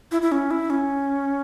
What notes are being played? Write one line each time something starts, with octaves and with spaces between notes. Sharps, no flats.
E4
E4
C#4
E4
C#4